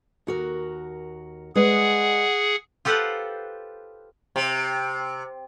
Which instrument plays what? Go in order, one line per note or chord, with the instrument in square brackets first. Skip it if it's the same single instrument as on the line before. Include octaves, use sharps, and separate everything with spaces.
[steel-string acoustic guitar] D#2 F#4 A#4
[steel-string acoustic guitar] G#3 B4 D5 [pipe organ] G#4 F#5
[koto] F4 G4 A4 B4 C5 F#5
[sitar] C3